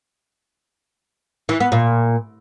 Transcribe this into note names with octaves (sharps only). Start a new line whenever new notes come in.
E3
B3
A#2